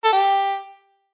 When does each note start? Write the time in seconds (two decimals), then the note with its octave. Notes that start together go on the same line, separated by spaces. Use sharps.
0.04 A4
0.13 G4